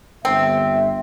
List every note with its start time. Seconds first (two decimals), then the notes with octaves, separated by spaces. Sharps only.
0.25 G1 C4 E5